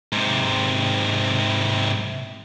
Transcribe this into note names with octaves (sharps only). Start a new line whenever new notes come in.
G#2 C3